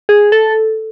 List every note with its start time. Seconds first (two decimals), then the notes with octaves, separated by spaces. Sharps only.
0.09 G#4
0.32 A4